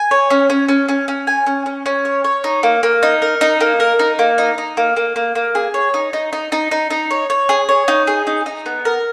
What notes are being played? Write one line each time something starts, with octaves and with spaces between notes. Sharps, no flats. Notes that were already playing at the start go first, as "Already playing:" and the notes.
Already playing: G#5
C#5
C#4
C#4
C#4
C#4
C#4
G#5
C#4
C#4
C#4
C#5
C#5
D#4
A#3
A#3
D#4
A#4
D#4
A#3
A#4
D#4
A#3
D#4
D#4
A#3
A#3
A#3
A#3
G#4
C#5
D#4
D#4
D#4
D#4
D#4
D#4
C#5
C#5
G#4
C#5
D#4
G#4
D#4
D#4
B3
A#4